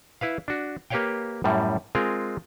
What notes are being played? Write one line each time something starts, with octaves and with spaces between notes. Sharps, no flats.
E4 B4 F5
D4 F#4
A#3 G4 B4 C#5 F5 G5
F#2 A2 G3
G#3 C4 F4 G#4 A#4